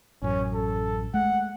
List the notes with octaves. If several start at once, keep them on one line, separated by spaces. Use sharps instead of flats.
A1 F#2 C#4
A4
G#3 A3 F#5